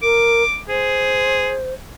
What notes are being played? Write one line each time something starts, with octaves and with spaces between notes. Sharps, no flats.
A#4 D6
G#4 C5